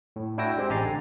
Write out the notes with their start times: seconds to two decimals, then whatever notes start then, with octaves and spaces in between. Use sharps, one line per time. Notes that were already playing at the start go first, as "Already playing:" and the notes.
0.16 A2
0.38 D4 E4 F#4 G5 E6 A#6
0.58 G#3 C4 G4
0.70 A1 G4 G#5 A#5 A6 C7
0.85 D3